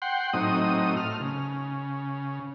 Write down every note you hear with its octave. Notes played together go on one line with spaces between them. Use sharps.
F#5 G5 C6
A2 F#3 C4 D#4 D#6
A3 F6
C#3